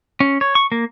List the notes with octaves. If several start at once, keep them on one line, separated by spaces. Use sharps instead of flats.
C#4
C#5
C#6
A#3